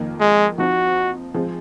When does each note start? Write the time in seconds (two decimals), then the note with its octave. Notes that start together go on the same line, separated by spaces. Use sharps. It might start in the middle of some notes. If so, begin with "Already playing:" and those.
Already playing: F2 D#3 A#3
0.20 G#3
0.58 F3 C4 D#4 F#4
1.34 F3 G#3 C4